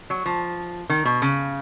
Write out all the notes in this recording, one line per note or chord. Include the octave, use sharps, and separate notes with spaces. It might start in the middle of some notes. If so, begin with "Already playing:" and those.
F#3
F3
D#3
B2
C#3